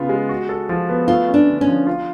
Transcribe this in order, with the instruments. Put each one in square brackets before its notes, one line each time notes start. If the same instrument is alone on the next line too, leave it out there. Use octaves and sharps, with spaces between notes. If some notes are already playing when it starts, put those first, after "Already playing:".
Already playing: [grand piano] C#3 B3 F4
G#3
F#4
A4
F3
B3
[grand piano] A3 [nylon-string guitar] F4
[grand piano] C#4
[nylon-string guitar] D4
[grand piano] D3
[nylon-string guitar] C#4
[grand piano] F3
F4